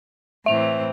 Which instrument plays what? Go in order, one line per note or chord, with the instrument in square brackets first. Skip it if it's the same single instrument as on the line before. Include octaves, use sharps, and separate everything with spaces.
[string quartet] A2 E3 C4 [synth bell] E5 F7